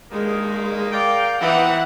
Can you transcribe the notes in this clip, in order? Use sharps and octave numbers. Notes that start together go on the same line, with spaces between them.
G2 D#3 G#3 A#3
A#4 D5 F5 G5
E3 B3 C4 D#4 F#5